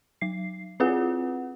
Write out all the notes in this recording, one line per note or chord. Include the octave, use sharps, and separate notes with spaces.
F#3 C7
C4 E4 F4 G#4 B4 F#5